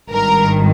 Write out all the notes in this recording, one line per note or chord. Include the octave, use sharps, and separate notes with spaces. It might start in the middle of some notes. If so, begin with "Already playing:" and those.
G#1 G2 D#3 A#4